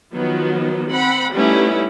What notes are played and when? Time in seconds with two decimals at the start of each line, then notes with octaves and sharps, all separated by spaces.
0.15 D#3 F3 F#3 B3
0.90 C4 F#5 B5
1.33 G3 A3 B3 C#4 D#4 E4